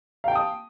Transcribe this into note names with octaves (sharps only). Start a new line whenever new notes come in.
F5 G5 A5 D#6